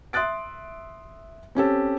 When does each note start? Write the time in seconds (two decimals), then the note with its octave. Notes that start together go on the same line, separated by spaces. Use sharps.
0.13 E5 C6 D#6 F#6 A6 D7
1.55 C4 C#4 G4 A4